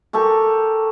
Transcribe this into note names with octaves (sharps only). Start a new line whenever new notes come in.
G4 A4 A#4 C#6